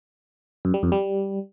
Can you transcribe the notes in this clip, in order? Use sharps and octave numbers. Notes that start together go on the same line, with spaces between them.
F#2
G3
F2
G3